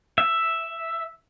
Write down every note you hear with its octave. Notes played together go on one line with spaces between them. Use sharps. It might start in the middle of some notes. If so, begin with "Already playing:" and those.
E5